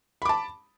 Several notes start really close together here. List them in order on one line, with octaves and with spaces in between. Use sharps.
B5 D6 A5